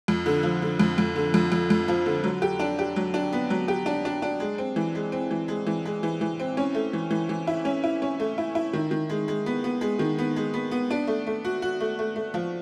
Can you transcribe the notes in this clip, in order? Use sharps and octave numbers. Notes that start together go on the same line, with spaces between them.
F2
D3
F3
D3
F2
F2
D3
F2
F2
F2
F3
D3
F#3
G4
D4
G4
F#3
D4
B3
F#3
G4
D4
D4
D4
G#3
C4
E3
G#3
C4
E3
G#3
E3
G#3
E3
E3
C4
C#4
A3
E3
E3
E3
E4
C#4
E4
C#4
A3
E4
E4
D#3
D#3
G#3
G#3
B3
B3
G#3
D#3
B3
G#3
B3
B3
D4
A3
A3
F#4
F#4
A3
A3
A3
F3